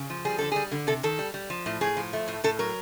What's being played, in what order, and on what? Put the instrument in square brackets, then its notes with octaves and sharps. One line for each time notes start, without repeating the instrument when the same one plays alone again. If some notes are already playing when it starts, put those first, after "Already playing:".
Already playing: [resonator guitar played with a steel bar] C#3
F3
G3 G#4
D3 A4
G3 G#4
D3
C3 A4
D#3 A4
G3
G3
F3
A2
A2 G#4
F3
A3
A2
A2 A4
F#3 A#4